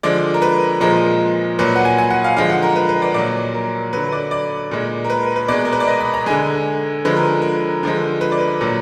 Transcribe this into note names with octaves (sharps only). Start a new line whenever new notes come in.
D3 F3 G#3 D5
A#4
B4
A#2 F3 G#3 A#4
A#2 F#3 B4
F#5
G#5
G#5
F#5
F5
D3 F3 G#3 F5
F#5
A#4
B4
B4
D5
A#2 F#3 D5
A#4
D3 F#3 B4
D5
D5
A#2 G#3
A#4
B4
A#4
B4
B2 G#3 D5
A#4
B4
D5
D#5
B5
A#5
D3 G#3 G#5
D3 F3 G#3 B4
A#4
A#4
D3 F3 G#3
B4
D5
B4
A#2 F#3